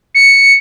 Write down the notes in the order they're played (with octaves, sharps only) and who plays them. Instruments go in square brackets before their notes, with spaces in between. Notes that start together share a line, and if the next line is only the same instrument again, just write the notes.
[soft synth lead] C#7